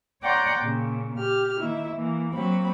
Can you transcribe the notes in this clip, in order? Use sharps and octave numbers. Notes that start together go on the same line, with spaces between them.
C#5 D5 F#5 G5 A#5 C6
A#2 C#3
G4 F6
D#3 A#3 E4 E5
E3 A#3
F#3 A#3 C4 B5